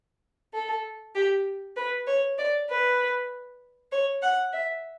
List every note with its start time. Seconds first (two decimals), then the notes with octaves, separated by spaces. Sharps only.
0.54 A4
1.15 G4
1.76 B4
2.07 C#5
2.38 D5
2.69 B4
3.92 C#5
4.22 F#5
4.53 E5